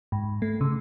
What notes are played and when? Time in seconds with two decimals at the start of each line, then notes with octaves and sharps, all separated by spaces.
0.12 G#2
0.42 A3
0.61 C#3